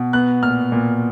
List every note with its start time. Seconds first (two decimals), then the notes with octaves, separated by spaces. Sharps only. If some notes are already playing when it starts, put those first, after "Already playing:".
Already playing: B2
0.13 B3 F#6
0.43 A#2 F6
0.72 A#2